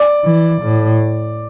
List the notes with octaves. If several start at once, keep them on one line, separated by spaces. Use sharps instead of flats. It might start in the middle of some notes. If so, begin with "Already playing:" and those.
Already playing: D5
E3
A2